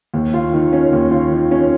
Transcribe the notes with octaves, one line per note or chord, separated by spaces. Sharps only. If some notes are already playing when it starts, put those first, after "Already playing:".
D#2
F4
D#3
C#4
D#2
F4
D#3
C#4